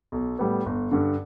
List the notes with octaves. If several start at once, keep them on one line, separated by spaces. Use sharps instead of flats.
B1
A2 G3 B3
G1
G2 D3